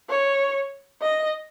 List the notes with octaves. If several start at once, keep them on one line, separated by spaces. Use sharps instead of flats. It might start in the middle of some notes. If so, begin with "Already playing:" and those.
C#5
D#5